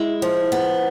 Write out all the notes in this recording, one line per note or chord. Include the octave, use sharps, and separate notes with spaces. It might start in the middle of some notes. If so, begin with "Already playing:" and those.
Already playing: G#3 E4
F3
B3